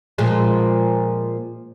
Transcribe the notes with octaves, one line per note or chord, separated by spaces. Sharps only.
A#2 F3 G#3